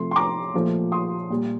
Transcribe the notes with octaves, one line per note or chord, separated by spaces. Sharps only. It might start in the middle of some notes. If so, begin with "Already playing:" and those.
Already playing: C3 F3 A3 C6
C6
A#5 D6
A#2 F3 A3
C6 D#6
A#2 G3